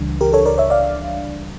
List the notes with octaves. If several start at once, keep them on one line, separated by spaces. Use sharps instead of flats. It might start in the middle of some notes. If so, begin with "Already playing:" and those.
Already playing: C#2 C#3 E3 G3 D4
G4 A#4
A4 C#5
A#4 D5
C#5 E5
D5 F5